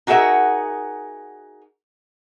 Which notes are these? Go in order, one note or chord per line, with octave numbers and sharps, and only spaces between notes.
D#4 F#4 G#4 A#4 E5 F#5